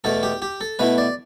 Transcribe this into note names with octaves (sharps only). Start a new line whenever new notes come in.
E2 B2 A3 A4
G4
G4
A4
B2 A3 E4 B4
D5